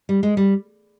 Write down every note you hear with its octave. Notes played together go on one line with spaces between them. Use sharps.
G3
G#3
G3